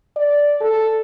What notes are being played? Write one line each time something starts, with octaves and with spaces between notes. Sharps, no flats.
D5
A4